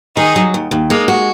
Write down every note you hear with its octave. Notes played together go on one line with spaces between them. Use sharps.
D#3 D#4 G#4
F#3
D#2
D#2
G#3 A#3 D#4
F#4